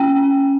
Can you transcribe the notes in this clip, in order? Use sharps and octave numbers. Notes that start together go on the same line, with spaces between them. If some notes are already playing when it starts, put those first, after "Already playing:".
Already playing: C#4 G5